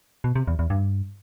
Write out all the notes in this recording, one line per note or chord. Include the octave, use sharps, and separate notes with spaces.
B2
C3
E2
E2
G2